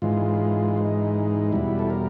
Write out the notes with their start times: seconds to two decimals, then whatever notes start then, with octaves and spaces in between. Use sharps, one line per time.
0.02 G#2 E3 G#3 F4
0.78 D#4
1.52 E2 B2 G3 E4
1.79 A4
1.90 A#4